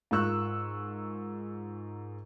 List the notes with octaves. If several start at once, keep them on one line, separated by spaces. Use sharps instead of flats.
G#2 F4 A#4 C#6 E6 F#6